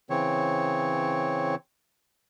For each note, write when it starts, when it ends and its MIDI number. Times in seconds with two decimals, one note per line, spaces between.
0.10 1.55 49
0.10 1.55 52
0.10 1.55 60
0.10 1.55 73